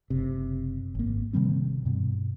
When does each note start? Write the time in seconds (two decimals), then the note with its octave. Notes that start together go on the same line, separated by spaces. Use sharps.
0.10 F#1 C3
0.95 G#1 A#3
1.33 C3 D#3 G3 C4
1.85 G2 B2